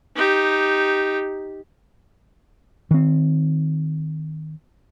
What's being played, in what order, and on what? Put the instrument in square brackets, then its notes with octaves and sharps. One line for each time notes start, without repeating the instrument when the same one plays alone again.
[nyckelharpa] D#4 G4
[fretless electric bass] D#3 C4